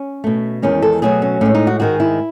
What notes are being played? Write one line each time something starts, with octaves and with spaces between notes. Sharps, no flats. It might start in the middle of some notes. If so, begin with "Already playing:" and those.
Already playing: C#4
B2 A3
E2 D#3 G#3 C#4
A4
B2 F#3 A3 G#4
C#4
A2 G#3 C#4
D#4
F#4
G#2 D#3 G#3 F#4
E4